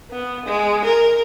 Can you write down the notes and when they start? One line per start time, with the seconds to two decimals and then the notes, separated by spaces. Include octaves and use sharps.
0.10 B3
0.45 G#3
0.84 A#4